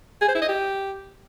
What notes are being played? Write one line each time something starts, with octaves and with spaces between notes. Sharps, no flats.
G#4
C5
E4
D#5
G4